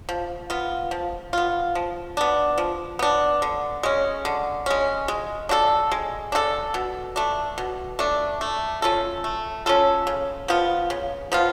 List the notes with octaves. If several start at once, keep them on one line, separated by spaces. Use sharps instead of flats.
F3
B3 F4
F3
B3 F4
F3
B3 D4
F3
B3 D4
D3
G#3 C#4
D3
G#3 C#4
G#3
D4 F#4 A4
G#3
D4 F#4 A4
B2
A3 D4
B2
A3 D4
A3
C#4 F4 A4
A3
C#4 F4 A4
C#3
F3 B3 F4
C#3
F3 B3 F4